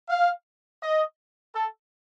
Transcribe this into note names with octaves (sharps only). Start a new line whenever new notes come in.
F5
D#5
A4